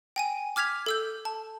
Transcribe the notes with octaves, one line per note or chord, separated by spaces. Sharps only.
G5 G#5 D#7
D6 F6 G#6 B6 F7
A4 E6 G6
A5